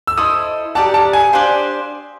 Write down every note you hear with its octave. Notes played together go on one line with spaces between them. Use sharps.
E6
E4 A4 C5 D#5 D#6
G4 A#4 D5 F#5 A5
A5
G#5
D4 G4 C5 F5